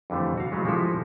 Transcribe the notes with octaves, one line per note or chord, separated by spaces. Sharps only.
F2 D3 E3 G3 A3
F#4 F5
C#3 E3 F#3 G#3 A3
F3 G3 G#3 D#4 E4 A4